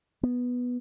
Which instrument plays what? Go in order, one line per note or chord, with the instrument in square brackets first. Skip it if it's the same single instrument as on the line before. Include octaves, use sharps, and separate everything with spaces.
[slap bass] B3